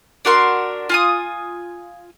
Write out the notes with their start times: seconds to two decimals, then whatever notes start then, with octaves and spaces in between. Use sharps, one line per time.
0.25 D4 F#4 A#4 C6
0.89 F4 G#5 D#6